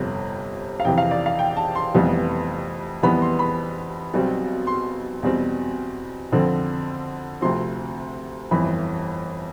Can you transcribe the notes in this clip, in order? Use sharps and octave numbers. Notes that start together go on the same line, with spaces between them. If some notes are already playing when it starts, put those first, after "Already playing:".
Already playing: G1 F2 C3
F5
F2 C3 E3 G5
F5
D5
F5
G5
A5
C6
F1 F2 E3 G3 B3
F2 E3 G3 B3 B5
C6
B5
B1 B2 G3 C4
C6
E2 B2 G3 C4
F2 D3 F3 C4
D2 C3 F3 C4 C6
G1 F2 E3 B5